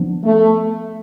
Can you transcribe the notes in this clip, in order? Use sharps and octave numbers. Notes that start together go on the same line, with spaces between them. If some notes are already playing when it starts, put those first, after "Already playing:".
Already playing: F3 B3 D4
A3